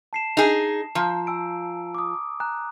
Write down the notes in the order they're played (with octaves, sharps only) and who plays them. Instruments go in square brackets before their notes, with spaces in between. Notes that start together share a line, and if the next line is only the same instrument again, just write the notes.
[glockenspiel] A5 C7 E7
[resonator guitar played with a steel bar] D#4 G#4
[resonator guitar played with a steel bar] F3 [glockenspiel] A#5
[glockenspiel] G#5 E6 D7
D6 D#6
G#5 A#5 F#6